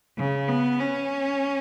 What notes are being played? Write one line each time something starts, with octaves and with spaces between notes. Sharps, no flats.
C#3
B3
C#4